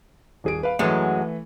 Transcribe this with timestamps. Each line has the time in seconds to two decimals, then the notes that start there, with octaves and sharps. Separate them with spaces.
0.44 D#1 G#4 D7
0.63 B4 F5
0.79 F#2 E3 F#3 G#3 A3